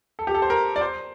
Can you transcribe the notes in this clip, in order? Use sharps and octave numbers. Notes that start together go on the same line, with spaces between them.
A4
G4
A4
C5
A#4
D5
C5